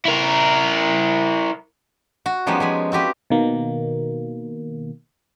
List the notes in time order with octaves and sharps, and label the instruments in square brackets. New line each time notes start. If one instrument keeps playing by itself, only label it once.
[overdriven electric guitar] E4 A#4
[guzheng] F#4
F3 G3 G#3 B3 C#4 D#4
F3 G#5 B5
C4 F#4 G4 B4
[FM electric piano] B2 D#3 A#3